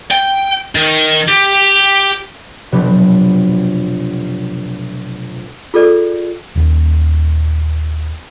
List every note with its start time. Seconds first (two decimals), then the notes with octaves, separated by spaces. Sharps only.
0.11 G5
0.75 D#3
1.28 G4
2.72 F1 B2 F#3 B3 D4 G4
5.74 F4 G#4 A4 D5
6.56 D#1 D#2